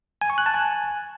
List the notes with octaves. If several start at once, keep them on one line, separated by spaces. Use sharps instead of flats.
G#5
C#6
F#6
A5
G#5